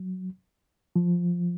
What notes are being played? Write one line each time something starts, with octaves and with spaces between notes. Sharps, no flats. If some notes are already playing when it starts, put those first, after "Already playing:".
Already playing: F#3
F3